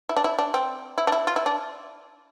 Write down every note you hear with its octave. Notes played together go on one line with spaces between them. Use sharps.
E4
D4
E4
D4
C4
E4
D4
E4
F4
E4
D4